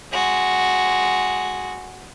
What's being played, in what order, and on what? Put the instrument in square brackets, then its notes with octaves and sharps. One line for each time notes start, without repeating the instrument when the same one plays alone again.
[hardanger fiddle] G#3 F#4